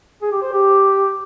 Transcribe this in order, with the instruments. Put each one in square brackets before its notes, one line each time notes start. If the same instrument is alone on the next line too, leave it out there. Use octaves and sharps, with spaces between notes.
[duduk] G#4
G4
C5
G4